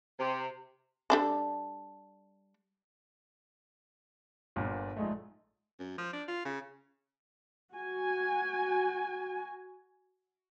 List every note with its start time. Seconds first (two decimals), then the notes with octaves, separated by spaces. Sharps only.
0.18 C3
1.10 G3 D4 A4
4.56 G1 G2 A#2
4.96 A#1 G#2 G#3 A3
5.79 F#2
5.98 F3
6.13 D4
6.28 F4
6.45 C#3
7.72 F#4 G#5